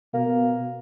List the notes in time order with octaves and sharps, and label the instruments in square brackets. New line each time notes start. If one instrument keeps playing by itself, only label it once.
[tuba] B2 [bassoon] A#3